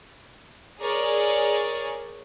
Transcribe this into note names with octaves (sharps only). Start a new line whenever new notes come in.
G#4 A#4 C#5 D5